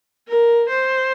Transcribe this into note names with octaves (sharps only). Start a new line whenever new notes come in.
A#4
C5